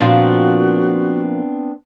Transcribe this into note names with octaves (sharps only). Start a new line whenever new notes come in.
A#2 F3 B3 C4 D4 F4 F#4